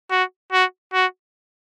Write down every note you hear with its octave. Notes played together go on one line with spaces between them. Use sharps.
F#4
F#4
F#4